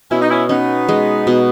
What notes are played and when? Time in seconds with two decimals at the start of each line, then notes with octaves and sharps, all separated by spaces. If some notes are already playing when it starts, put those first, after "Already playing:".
0.10 B2 C#4 E4
0.21 D#4
0.30 C#4 E4
0.49 B3 C#4 D#4
0.88 G#3
1.27 B2